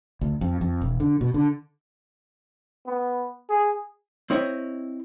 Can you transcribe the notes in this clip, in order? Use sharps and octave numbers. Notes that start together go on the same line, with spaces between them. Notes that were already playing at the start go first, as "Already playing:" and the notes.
D2
F2
F2
E1
D3
B2
D3
B3
G#4
C4 E4 C#5 D#5